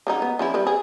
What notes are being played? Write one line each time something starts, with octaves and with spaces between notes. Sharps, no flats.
C#3 F#3 D#4
B3
F3 C#4 E4
G3 C4 B4
G#4